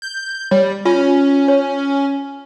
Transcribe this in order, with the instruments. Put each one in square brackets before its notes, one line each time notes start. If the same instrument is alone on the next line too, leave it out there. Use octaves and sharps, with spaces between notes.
[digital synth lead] G6
[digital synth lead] G3 [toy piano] C#5
[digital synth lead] C#4 [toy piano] F4
[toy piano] C#5